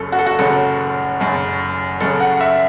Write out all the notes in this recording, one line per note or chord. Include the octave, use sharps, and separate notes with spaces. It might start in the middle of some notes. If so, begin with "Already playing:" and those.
Already playing: F#1 F#2 C#3 A4
F#4
A4
F#4
F#1 F#2 C#3 A4
F#1 F#2 C#3
F#1 F#2 C#3 A4
F#5
E5